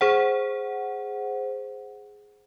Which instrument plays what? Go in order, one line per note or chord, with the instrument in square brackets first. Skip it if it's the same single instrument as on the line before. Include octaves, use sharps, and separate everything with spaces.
[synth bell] G#4 C5 F#5